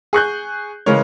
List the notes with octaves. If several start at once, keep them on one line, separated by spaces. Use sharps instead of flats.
G#4 C#6 F#6 G6
C#3 E3 G#3 A#4 C#5